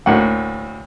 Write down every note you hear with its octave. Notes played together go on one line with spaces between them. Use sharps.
D2 A2 A#3 F#5